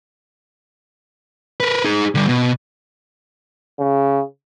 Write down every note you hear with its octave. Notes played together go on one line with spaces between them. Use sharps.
A#4 B4
D#4 G#4
D3 G3
B2
C#3